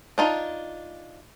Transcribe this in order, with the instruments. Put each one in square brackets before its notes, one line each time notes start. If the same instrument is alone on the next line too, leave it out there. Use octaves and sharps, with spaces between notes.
[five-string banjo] D4 D#4 F4